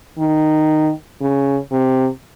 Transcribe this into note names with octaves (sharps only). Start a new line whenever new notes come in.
D#3
C#3
C3